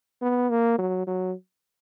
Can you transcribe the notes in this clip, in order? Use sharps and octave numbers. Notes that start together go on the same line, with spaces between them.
B3
A#3
F#3
F#3